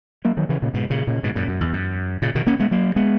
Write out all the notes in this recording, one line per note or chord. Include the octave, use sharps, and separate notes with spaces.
F#3 A#3
D#3 F#3
C#3 E3
A#2 C#3
G#2 B2
A#2 C#3
A#2 C#3
G#2 B2
F#2 A#2
F#2
E2
F#2
A#2 C#3
B2 D#3
A#3 C#4
G#3 B3
F#3 A#3
G#3 B3